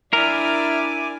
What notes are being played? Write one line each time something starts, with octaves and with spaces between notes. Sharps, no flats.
D4 E4 A#4 D5 E5 G#5 D6 F6